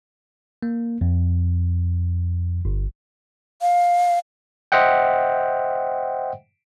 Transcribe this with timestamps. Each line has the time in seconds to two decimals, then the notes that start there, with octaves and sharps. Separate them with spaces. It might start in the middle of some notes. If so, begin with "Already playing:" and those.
0.63 A#3
1.01 F2
2.65 G1
3.62 F5
4.72 C5 D#5 E5 F#5 G5